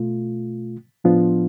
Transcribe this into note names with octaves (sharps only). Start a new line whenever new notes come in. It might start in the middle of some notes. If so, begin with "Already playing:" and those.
Already playing: B2 A3 F4
A2 F3 B3 D4 F4